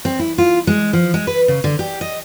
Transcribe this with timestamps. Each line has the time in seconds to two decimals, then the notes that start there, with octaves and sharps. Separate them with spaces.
0.05 C4
0.19 E4
0.38 F4
0.67 G#3
0.93 F3
1.14 G#3
1.27 B4
1.48 C#3
1.64 D3
1.79 G4
2.01 D#5